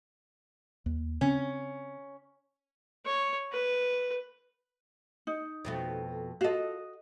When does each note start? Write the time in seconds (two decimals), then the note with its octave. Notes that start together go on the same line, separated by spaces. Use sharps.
0.86 D#2
1.21 C#3 C4 C#4
3.06 C#5
3.53 B4
5.27 D#4
5.65 F2 B2 A3
6.41 F4 F#4 A4 D#5